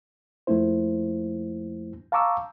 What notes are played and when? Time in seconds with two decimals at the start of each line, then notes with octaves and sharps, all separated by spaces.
0.47 F2 F3 A3 A#3 E4 C5
2.12 F5 A5 A#5 C#6 D6 E6